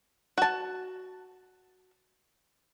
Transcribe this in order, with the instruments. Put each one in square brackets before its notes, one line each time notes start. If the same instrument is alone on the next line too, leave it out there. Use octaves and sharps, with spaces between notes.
[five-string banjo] F#4 A5